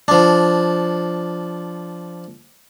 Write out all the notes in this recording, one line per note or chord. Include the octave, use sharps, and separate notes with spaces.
F3 D4